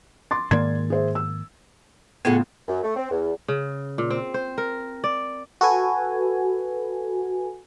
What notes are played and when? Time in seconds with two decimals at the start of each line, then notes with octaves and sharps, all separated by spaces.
0.31 C6 D6 A6
0.51 G#2 D#3 A#3 D5 C6 G#6
0.90 G#4 C5 E5
1.15 E6
2.25 A2 C#3 B3 F4 G#4 A4 F#5
2.68 F#2
2.83 A3
2.96 C4
3.11 E2
3.48 C#3
3.98 A#2
4.10 C4
4.34 C5
4.58 A#4
5.04 D5
5.61 F#4 A4 B4 G#5